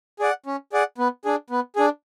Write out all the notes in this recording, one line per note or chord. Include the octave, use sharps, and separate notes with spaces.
G#4 D5 F#5
C#4
G#4 D5 F#5
B3
D4 G#4
B3
D4 G#4